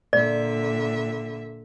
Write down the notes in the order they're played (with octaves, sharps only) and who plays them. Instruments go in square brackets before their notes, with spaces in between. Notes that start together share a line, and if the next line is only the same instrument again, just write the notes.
[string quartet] A#2 D3 E5 [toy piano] D5